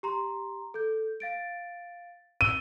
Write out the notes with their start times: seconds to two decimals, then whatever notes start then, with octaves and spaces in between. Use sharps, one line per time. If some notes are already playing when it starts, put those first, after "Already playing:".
0.03 G4 A#5 C6
0.74 A4 G6
1.20 F5 A6 D7
2.41 E6 D#7 G7